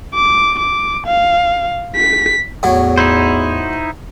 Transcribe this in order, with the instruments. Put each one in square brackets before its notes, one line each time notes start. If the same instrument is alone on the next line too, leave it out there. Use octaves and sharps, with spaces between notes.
[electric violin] D6
D6
F5
B6
[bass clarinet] E2 [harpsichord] A2 F#3
[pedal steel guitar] D#4 E4 C5